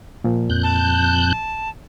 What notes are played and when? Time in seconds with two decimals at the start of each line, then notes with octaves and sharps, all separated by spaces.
0.24 A#2 F3
0.50 F2 F#6 G6
0.63 A5